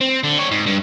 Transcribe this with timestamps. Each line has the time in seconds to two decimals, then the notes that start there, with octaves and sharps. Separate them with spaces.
0.01 C4
0.24 D3
0.38 G3 C#5
0.51 G#2
0.66 G2